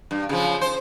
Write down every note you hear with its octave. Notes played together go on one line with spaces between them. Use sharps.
G2
C#3 F3
C5